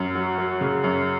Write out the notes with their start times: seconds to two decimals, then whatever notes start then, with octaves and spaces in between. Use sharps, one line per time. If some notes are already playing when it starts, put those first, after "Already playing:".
Already playing: F#2
0.15 F#3
0.38 F#3
0.61 C#3
0.84 F#2